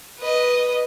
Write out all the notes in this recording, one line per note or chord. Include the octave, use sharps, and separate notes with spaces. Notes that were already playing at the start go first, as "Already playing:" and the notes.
B4 D#5